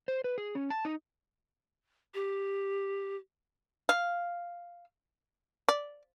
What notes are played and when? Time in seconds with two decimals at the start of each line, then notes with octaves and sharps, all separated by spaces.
0.08 C5
0.24 B4
0.38 G#4
0.55 C#4
0.70 A5
0.85 D#4
2.14 G4
3.89 F5
5.68 D5